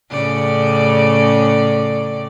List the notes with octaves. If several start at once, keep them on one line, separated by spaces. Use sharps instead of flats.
A2 C#3 D5